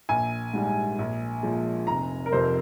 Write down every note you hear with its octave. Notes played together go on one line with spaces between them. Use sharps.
A#1 G#5
G#2 G3
A#1
A#2 F3 G#3
F1 A#5
A#4
F2 C3 F3 C5